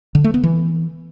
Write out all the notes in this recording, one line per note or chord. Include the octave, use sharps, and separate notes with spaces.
D3
A3
B3
E3